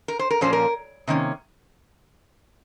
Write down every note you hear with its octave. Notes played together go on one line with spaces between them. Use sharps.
A#4
C5
A#4
A#2 F3 A#3 C#4 C5
A#4
C3 D#3 A#3 C#4